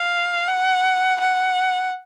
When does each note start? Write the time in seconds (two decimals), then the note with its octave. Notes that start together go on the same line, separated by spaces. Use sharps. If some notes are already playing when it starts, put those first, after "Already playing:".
Already playing: F5
0.48 F#5
1.20 F#5